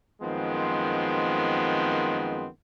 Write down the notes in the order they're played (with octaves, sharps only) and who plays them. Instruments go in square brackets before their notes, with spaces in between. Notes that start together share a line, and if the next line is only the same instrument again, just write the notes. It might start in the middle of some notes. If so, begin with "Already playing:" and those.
[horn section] F#2 D#3 F3 G#3 B3 C4